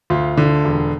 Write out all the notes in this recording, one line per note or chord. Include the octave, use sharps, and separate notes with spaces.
D2 F4
D3
E1